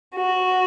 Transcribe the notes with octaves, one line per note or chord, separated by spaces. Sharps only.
F#4